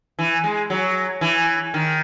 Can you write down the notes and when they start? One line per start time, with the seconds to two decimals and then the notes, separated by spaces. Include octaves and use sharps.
0.19 E3
0.44 G#3
0.70 F#3
1.21 E3
1.74 D#3